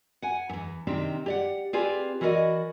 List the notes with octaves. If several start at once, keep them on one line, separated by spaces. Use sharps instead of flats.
F#5 G#5
E2 G2
C3 D#3 C4 D4 G4
G4 D5 F#5
C4 F4 G4 G#4 B4 D5
E3 F#4 A#4 B4 D5 D#5